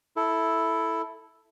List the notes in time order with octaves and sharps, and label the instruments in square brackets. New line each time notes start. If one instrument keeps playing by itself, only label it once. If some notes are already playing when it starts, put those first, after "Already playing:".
[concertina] E4 A4